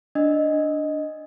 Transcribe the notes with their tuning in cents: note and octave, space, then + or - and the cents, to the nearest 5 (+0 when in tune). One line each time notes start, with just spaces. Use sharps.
D4 +0 D#5 +0